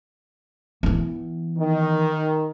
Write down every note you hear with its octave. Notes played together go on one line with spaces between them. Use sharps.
E3 B3
D#3